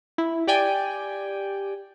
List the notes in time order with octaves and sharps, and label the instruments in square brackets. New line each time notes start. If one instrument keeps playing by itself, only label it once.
[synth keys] E4
G4 D5 G5 G#5